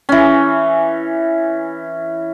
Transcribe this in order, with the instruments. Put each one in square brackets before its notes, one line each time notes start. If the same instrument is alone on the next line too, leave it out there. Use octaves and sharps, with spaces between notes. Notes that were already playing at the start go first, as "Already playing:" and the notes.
[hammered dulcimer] E3 C#4